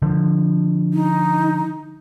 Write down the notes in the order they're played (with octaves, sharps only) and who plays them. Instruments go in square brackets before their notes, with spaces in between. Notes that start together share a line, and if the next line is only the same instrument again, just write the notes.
[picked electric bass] D3 F3
[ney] D#4